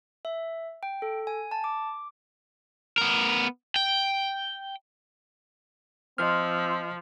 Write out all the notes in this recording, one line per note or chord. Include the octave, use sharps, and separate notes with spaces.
E5
G5
A4
G#5
A5
D6
B3 A#4
G5
F3 C4 D#5 F6